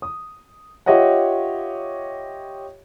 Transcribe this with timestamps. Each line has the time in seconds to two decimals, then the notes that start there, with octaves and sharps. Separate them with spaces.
0.02 D#6
0.86 F4 G4 C#5 D#5 E5 F#5